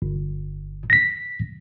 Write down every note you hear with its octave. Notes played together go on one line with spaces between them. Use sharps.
G1
A#6 B6